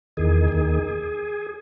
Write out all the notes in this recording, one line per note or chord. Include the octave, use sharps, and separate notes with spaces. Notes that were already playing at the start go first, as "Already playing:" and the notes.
E2 D#3 G#4
D#2 D#3